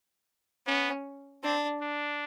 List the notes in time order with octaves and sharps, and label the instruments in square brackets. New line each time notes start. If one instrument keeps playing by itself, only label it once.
[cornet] B3 [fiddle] C#4
[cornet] C4 [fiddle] D4
[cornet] D4